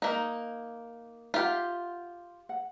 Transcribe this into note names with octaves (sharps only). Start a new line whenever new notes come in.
A#3 D#4 D#5
F4 G4 E5 F#5
F#5